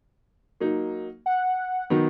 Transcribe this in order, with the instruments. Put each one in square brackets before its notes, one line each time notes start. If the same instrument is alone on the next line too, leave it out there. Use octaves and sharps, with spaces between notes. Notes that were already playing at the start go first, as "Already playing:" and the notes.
[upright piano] F#3 A#3 D#4
[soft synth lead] F#5
[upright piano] D#3 F#3 B3 D#4